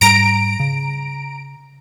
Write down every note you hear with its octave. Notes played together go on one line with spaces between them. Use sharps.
G#2 G3 A#5 D7
C#3